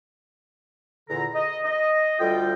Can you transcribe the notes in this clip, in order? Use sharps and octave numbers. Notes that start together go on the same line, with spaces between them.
E2 A#2 D3 A4 A#5
D#5
D#5
D2 G3 F4 A4 G5